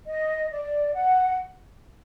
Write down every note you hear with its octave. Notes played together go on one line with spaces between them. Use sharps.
D#5
D5
F#5